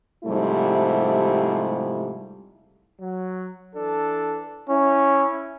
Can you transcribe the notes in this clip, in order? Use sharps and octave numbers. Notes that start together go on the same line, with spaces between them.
G#2 C3 F3 G3 A3 E4
F#3
E3 D4 A4
C#4 E4